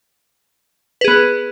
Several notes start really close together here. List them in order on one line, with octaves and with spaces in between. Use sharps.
B4 G#4 B3